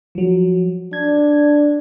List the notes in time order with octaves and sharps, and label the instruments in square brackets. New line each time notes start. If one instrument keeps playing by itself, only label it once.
[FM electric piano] F3 F#3
[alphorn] D4 [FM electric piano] G#6